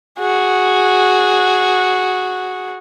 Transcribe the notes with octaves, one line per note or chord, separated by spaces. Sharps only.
F#4 G#4